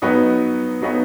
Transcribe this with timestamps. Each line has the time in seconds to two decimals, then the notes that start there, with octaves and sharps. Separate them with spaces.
0.02 F#3 B3 D#4 F#4 B4
0.81 F#3 B3 D#4 F#4 B4